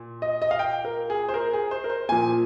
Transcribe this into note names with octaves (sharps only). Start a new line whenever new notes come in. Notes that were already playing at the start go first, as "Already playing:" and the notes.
Already playing: A#2
D#5
D#5
F5
G5
A#4
G#4
C5
A#4
G#4
C5
A#4
C5
A#2 F3 A#3 G#5